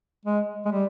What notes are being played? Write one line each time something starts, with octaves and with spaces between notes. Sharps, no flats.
G#3
G#3
G3